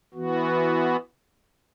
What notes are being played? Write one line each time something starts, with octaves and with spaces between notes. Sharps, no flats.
E3 B3 F#4